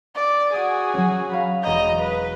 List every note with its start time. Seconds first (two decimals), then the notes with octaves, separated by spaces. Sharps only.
0.15 D5
0.54 F#4 G#4 D#6 D#7
0.94 F#3 C#4
1.30 F5 A#5 B5
1.63 E1 D#5 A#5 G6
2.00 B4